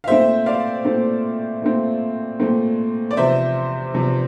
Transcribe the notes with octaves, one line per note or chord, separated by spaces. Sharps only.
F5
A#2 A3 C4 C5 E5
D5 F5
A#2 A3 C4
A#2 A3 C4
A#2 A3 C4
D5
E2 C3 F3 C5 E5
E2 C3 F3